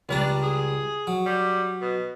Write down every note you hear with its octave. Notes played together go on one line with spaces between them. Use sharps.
C#2 G3 D4 A#5
G#4
F#3
G3
B2